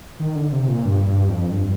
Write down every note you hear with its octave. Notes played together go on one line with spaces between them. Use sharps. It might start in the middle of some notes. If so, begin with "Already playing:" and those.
D#3
D3
C3
A#2
G2
G2
F2
G2